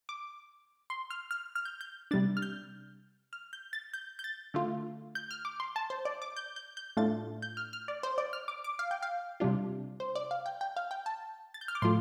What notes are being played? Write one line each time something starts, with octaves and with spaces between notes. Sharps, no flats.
D6
C6
F6
F6
F6
G6
G6
C3 G3 D4 A6
F6
G6
F6
G6
A6
G6
G6
A6
D3 A3 F4
G6
F6
D6
C6
A5
C5
D5
D6
G6
G6
G6
A2 A3 D4 F4 A6
G6
F6
F6
D5
C5
D5
F6
D6
D6
F5
G5
F5
C3 G3 D4 F4
C5
D5
F5
G5
G5
F5
G5
A5
A6
G6
F6
D6
A2 F3 A3 F4 C6